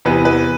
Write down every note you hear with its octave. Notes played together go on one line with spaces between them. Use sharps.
E2 C3 E3 B3 B4
B4